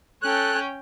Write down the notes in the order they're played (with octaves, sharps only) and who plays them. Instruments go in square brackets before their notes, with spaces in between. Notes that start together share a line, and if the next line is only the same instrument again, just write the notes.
[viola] C#4 G5 [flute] A4 [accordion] F#6